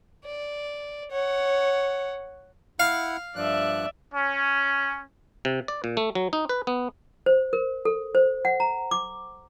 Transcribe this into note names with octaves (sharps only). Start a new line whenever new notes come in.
D5
C#5 F#5
E4 F5 F#5
G2 F3 D5 E5 F#6
C#4
C3
D5
A#2
A3
F#3
D#4
B4
B3
C5
A#4
A4
C5
F#5
A#5
D6